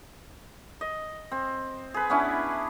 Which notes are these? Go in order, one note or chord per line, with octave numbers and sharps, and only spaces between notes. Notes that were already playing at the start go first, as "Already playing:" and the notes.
D#5
C4
G#4 B4
B3 C#4 D4 E4